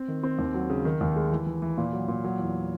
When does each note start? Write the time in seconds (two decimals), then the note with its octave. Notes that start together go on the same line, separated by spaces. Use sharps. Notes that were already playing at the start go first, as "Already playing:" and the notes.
Already playing: C4
0.08 D#3
0.23 C4
0.39 D#2
0.54 F#3
0.70 C#3
0.85 D#3
1.01 D#2
1.16 G#3
1.32 E3
1.46 E3
1.62 E3
1.78 A#2
1.93 F#3
2.08 A#2
2.24 F#3
2.39 E2